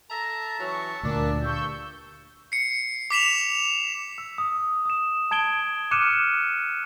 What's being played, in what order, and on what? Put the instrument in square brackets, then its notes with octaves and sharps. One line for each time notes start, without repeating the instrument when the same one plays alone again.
[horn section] A4 A#5 [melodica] E5 A5
[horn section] E3 F#3 C#4 [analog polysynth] C#6
[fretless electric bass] D2 [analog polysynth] A#2 [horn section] D4
[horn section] G2 [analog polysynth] C#6 E6 G6
[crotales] C7 C#7
D6 B6 E7 F7
[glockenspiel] E6
D#6
D#6 E7
A5 G#6 D7 G7
D6 F6 F#6 C#7 D#7 E7